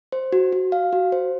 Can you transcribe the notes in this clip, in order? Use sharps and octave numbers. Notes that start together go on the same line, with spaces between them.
C5
F#4
F#4
F5
F#4
C5